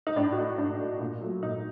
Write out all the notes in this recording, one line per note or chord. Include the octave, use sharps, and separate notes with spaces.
D#4
A2 D4
F#4
A3 D#4
A2 D4
A3
A#2
F#3 A3
A#2 D#4